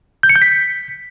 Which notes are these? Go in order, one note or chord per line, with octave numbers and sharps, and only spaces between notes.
G6
C#7
G6
B6